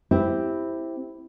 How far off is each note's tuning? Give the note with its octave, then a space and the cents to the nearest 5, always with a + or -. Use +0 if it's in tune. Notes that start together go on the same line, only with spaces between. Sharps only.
C4 +0 E4 +0 G4 +0